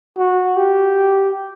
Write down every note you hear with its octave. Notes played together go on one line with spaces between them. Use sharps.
F#4
G4